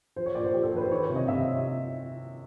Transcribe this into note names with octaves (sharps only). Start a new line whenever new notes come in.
F3 C5
C#5
A#2 D5
C5
F3 G4
A4
F3 B4
C5
D#3 C#5
C#5
C3
D#5
C3 E5